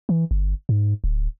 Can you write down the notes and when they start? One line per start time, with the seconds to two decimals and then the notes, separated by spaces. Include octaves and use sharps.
0.09 E3
0.31 G1
0.69 G#2
1.04 D1